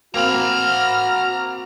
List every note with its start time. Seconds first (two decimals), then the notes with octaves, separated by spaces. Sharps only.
0.14 A#3 C4 F#4 A#5 B5 F6